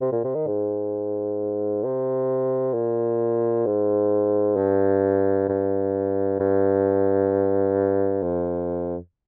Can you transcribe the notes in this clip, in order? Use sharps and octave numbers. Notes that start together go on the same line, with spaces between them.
C3
A#2
C3
D#3
G#2
C3
A#2
G#2
G2
G2
G2
F2